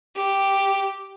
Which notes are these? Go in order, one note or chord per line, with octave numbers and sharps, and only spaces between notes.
G4